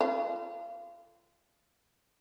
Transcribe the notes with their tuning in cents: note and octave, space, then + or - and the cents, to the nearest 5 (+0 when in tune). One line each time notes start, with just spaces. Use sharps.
F4 -30